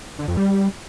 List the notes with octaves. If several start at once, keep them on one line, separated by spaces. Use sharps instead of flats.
D3
F2
G3